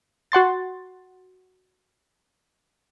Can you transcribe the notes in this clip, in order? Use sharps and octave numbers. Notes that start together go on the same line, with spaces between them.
F#4 F#5 C6 A6